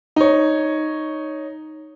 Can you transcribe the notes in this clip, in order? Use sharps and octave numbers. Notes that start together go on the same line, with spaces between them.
D#4 C#5